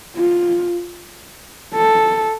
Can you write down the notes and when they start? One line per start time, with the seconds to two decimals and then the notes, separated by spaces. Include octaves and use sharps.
0.16 F4
1.74 A4